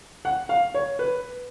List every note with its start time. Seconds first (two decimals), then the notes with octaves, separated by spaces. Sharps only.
0.25 F#5
0.49 F5
0.74 C#5
0.99 B4